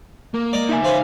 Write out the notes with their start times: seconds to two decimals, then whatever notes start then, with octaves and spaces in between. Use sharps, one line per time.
0.34 A#3
0.53 D5 D#5 A#5
0.69 D#4 E5 G#5
0.84 C#4 B4 C5 F5